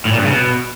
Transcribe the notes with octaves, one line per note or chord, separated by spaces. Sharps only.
A2
A#2
G2
C#3
B2